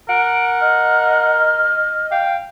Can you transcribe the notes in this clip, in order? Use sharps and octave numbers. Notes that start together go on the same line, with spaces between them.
A#4 F#5 D7
D#5 F6
F5 G5